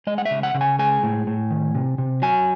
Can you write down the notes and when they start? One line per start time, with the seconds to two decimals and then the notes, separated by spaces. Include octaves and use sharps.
0.07 G#3 D#5
0.18 F#5
0.25 E5
0.31 C#3
0.43 F#5
0.54 C#3
0.61 G#5
0.79 G#3 G#5
1.03 A2
1.27 A2
1.51 D#3
1.75 C3
1.98 C3
2.22 F#3 G#5